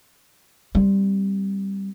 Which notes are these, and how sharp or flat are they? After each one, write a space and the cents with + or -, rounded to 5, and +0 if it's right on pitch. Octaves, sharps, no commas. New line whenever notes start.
G3 +0 C4 +0